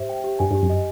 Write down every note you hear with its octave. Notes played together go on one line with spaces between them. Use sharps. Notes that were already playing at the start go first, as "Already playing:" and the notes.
Already playing: G#2 G4 C5 E5
G5
G4
G2 G#5
G2
G4
F#2
D#5